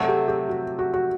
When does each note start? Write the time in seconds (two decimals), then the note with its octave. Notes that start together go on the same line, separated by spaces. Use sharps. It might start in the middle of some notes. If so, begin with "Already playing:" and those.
Already playing: C3 F#3 A3 A4
0.08 G4
0.28 G4
0.49 F#4
0.79 F#4
0.94 F#4